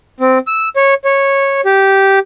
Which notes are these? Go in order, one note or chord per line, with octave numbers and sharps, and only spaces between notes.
C4
E6
C#5
C#5
G4